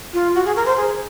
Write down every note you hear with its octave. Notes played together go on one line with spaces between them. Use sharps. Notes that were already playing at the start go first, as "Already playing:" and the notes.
F4
F#4
G#4
A#4
C5
G#4